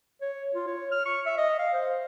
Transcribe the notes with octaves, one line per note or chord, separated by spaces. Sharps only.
C#5
F4
C#5
F6
C#6
E5
D#5
F5
C5